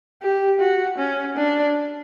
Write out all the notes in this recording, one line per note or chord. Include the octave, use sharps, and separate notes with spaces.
G4
F#4
C#4
D4